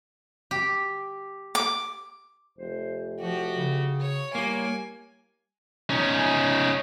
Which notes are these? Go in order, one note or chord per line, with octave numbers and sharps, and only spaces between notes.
G4
D6
F1 C5
F3 F#4 G4
C#3
C#5
G3 A#3 E4 C#5 G#5
C#4 D#4